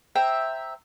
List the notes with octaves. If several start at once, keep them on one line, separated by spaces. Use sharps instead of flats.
C5 E5 G5 A#5